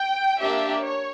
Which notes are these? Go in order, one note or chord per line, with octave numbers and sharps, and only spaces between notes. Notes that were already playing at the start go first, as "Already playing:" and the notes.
Already playing: G5
A#3 D4 G4 E5
C#5